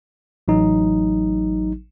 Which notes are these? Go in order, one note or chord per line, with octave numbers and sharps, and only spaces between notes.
A1 F#3 D#4